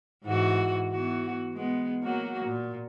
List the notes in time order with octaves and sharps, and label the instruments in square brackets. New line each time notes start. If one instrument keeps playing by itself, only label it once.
[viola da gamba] G#2 E3 F#4
E3 B3 F#4
G#3 B3
F#3 A#3 F#4
A#2